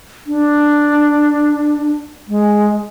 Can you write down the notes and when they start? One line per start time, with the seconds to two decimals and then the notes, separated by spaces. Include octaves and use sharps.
0.27 D4
2.28 G#3